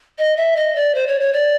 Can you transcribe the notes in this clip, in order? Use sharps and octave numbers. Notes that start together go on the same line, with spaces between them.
D#5
E5
D#5
D5
C5
C#5
C#5
D5